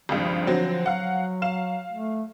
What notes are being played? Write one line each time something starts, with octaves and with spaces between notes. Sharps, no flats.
G#1 C#2 G2 F3
D3 F#3 C4
F#3 F5 F#5
F5 E7
A3